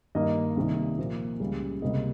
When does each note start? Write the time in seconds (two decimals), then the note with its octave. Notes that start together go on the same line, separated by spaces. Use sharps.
0.15 G2 D#3 A#3 D#5
0.56 C2 C3 D#3 A#3
0.98 A#2 F3 A#3
1.40 C#2 C#3 G3
1.82 C#2 C3 G3 A#3 D#5